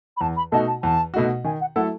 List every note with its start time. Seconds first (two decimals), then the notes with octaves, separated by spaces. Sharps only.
0.17 B5
0.21 E2 A5
0.36 B5
0.52 B2 A3 D#4 F#4 A5
0.67 A5
0.83 E2 A5
1.14 B2 A3 D#4 F#4
1.44 D#3 G#5
1.61 F#5
1.76 F#3 A3 E4 A4 F#5